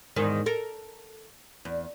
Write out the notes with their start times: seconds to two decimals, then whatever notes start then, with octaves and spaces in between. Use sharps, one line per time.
0.16 E2 G#2 D#3
0.46 A4 A#4
1.65 E2